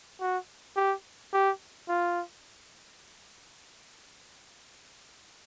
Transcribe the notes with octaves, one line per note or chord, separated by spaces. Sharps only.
F#4
G4
G4
F4